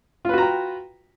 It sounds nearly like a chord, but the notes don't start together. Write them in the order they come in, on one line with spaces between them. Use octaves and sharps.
F4 B4 F#4 A#5 G5